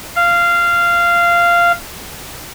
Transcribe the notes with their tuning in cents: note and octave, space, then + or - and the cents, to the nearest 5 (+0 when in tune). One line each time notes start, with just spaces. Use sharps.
F5 -15